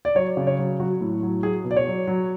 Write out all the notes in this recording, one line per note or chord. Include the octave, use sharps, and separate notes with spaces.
D5
F#3 C#5
C#3
C#5
F#3
F#3 F#4
A2
F#3
F#3 G#4
B2
D5
C#5
F#3
F#3